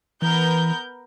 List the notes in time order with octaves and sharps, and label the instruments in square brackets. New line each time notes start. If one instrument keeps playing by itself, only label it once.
[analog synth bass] E3 [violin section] B3 A#4 G6